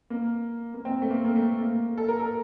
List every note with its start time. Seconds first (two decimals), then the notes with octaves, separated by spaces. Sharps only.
0.10 A#3
0.74 A#3
0.85 C4
1.02 A3
1.10 A#3
1.25 A#3
1.35 A3
1.61 A#3
1.98 A4
2.08 A#4
2.19 A4